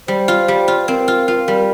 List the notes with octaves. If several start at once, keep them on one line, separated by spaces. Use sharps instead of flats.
G3 C5
F4
G3
F4
C4 A#4
F4
F4
G3